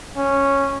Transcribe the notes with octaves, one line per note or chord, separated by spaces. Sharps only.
C#4